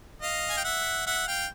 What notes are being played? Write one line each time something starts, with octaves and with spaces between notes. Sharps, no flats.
D#5 F5
G#5
G5
E5 F#5
E5 F#5
F5 G5